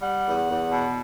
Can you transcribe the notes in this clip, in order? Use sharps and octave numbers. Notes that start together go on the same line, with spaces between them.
G3 F#5
E2
E2
B2